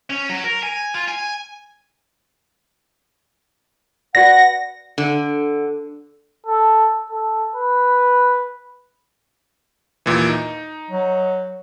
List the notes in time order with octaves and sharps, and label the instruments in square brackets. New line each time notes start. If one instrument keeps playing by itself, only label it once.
[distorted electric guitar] C#4
F#3
A#4
G#5
F4
G#5
[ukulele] F#4 B4 D5 [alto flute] F#5 [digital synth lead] A#6
[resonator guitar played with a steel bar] D3
[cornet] A4
A4
B4
[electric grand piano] D#2 A#2 E3
D#4
[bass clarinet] F#3